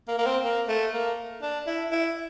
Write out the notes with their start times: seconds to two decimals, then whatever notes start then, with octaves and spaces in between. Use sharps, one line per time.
0.08 A#3
0.18 A#3
0.26 C4
0.44 A#3
0.69 A3
0.94 A#3
1.42 D4
1.67 E4
1.91 E4